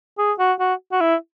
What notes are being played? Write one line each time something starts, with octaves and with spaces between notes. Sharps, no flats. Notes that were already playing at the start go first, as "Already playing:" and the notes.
G#4
F#4
F#4
F#4
E4